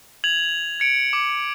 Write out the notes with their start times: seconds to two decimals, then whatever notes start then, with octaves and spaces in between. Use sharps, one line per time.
0.24 G#6 F7 F#7
0.80 G#6 C#7 D7
1.13 D6